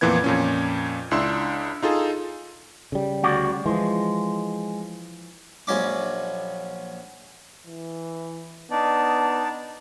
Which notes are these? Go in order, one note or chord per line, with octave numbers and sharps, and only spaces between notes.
F2 A#2 E3 B3 G#6
F2 A#2 C#4
C#2 D4 E4 C6 E6
D#4 F4 G#4 A4
C#3 G3
D2 F#4 D5
E3 F3 G#3
A#1 F#3 C#4 D6
E3
B3 D4 D#4 D5 A5